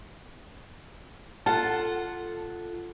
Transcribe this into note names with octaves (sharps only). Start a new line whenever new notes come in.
F4 A4 F#5 A5